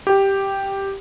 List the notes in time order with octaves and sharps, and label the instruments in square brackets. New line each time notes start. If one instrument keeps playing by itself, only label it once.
[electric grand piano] G4